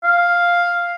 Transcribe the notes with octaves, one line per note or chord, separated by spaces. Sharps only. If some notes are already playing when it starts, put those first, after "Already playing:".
F5